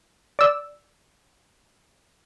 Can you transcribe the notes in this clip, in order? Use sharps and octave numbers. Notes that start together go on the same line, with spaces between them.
D5 E6